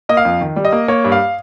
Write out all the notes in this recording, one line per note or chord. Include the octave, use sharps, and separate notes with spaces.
A#3 D#5
F5
F2
D#3
G3
D#5
A#3
A#3 C#5
G2
F5